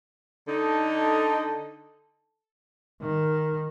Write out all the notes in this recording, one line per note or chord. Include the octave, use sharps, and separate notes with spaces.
D3 D#4 A4
D#3